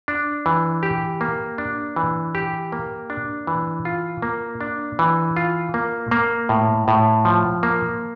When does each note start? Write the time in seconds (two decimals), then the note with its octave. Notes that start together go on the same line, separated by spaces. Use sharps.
0.08 D4
0.46 E3
0.83 G4
1.21 A#3
1.58 D4
1.96 E3
2.35 G4
2.72 A#3
3.10 D4
3.47 E3
3.85 F4
4.22 A#3
4.61 D4
4.99 E3
5.36 F4
5.74 A#3
6.11 A#3
6.49 A2
6.88 A2
7.25 F3
7.63 A#3